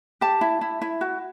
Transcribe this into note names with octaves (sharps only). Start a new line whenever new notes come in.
G4 A5
E4
E4
E4
F#4